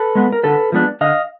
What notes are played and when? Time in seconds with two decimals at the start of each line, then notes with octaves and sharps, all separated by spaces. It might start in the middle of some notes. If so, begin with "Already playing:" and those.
Already playing: A4 B4
0.15 G#3 B3
0.32 A#4
0.43 D3 A4 B4
0.72 F3 G#3 B3 D4
1.01 D3 D#5 F5